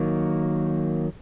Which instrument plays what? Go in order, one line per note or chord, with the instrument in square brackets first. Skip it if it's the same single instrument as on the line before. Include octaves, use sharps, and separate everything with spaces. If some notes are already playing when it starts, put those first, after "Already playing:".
Already playing: [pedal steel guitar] D#3 F#3 A#3